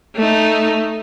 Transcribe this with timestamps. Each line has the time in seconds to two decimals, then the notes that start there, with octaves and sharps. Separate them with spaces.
0.16 A3 D#4